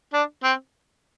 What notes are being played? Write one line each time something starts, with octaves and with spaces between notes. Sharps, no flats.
D4
C4